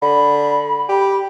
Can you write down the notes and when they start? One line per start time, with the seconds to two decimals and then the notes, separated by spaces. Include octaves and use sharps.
0.02 D3 B5
0.89 G4